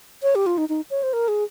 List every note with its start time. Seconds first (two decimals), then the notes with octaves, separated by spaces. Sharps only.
0.23 C#5
0.35 G4
0.46 F4
0.58 D#4
0.69 D#4
0.91 C#5
1.03 C5
1.13 A#4
1.28 G#4